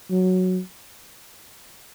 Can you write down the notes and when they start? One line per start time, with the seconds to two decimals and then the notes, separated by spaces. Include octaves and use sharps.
0.11 F#3